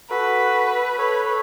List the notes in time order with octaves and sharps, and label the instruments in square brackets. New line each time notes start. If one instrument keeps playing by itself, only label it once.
[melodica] F#4 A4 [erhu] B4
[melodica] A4 C#5 [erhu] B4